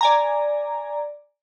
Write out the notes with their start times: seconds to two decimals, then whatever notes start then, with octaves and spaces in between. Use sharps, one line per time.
0.01 D5 G#5 A#5